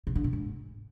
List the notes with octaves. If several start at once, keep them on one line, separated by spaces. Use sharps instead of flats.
C3
D3
A#2
G#2